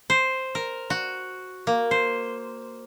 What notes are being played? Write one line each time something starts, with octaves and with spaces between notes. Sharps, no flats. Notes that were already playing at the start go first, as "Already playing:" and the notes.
C5
A#4
F#4
A#3
C5